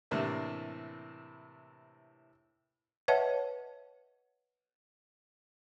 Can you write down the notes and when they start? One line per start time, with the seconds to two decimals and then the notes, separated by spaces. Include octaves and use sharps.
0.11 A2 C3 E3 A#3 D4 E5
3.08 B4 C#5 D#5 E5 F#5 A5